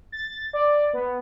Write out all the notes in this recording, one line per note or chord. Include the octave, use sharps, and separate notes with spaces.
A6
D5
B3